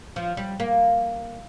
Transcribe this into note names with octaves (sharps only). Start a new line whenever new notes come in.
F3
G3
A#3